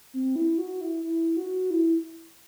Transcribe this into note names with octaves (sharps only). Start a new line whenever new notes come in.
C4
E4
F#4
E4
E4
F#4
E4